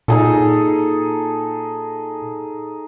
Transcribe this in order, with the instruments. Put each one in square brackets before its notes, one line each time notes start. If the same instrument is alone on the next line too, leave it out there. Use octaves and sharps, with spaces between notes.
[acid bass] A#2 [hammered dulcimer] D#4 G#4 A4